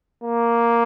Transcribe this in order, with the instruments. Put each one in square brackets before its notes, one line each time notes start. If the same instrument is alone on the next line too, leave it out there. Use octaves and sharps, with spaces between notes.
[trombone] A#3